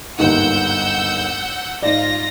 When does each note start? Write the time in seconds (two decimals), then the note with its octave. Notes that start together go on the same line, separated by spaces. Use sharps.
0.18 G1 D#2 G#2 F#5 E6 G6
1.82 G#2 F4 D5 A#6